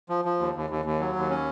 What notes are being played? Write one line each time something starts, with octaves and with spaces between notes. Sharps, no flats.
F3
F3
D#2
D#2
D#2
D#2
F#3
D#2
C#4